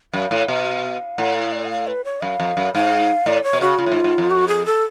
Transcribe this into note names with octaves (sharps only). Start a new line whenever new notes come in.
F#2 F5
A2
B2
A2 F#5
F5
D5
F#5
F5
B4
C#5
F#2 F5
F2
F#2
G#2 F5
A2 D5
C#5
B2
C#3 F#4
C#3 F4
A2
G#2
G#2
F2
F#4
G#4
A4